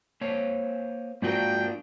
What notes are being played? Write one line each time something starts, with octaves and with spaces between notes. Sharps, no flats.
A#3 C5 C#5
G#2 A#3 D4 F4 F#4 A#4 G5